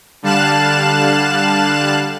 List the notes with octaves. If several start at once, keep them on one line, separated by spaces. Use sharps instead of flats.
D3 G3 F5 A5 F#6 E7